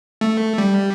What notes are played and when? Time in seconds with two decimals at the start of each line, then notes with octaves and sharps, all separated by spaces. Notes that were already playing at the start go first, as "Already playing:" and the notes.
0.21 A3
0.58 G3